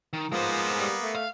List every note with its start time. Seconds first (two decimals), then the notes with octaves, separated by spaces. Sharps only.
0.13 D#3
0.32 F3 G#3 A#3 B3 C5
0.80 G3
1.02 A3
1.15 F5